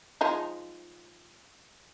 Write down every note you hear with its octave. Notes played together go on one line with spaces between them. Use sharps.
F3 G#3 D#4